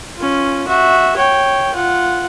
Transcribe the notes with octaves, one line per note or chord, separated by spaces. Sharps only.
C#4 F4
F#4 E5
C#5 G5
F4 F#5